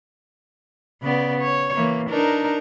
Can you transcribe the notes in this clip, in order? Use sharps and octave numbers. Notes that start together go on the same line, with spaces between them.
C#3 B3 D5
C#5
E3 A#3
D4 D#4 A#4